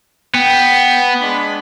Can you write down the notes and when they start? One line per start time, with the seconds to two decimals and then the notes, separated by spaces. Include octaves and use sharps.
0.35 B3 G5
1.21 G#3 D4 B5